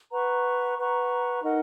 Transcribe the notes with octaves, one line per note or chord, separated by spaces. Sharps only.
B4 F#5 A#5 C#6
B4 F#5 A#5 C#6
D#4 A#4 D#5 F#5